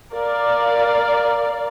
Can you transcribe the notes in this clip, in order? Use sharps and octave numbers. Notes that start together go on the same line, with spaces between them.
A#4 D5 F5